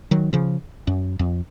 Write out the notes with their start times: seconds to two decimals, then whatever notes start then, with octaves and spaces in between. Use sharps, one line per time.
0.11 D#3 F#3
0.33 C#3 F3
0.87 F#2
1.19 F2